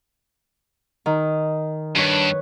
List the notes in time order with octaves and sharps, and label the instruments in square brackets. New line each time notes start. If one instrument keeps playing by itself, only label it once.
[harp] D#3
[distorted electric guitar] G2 [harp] B4 C#5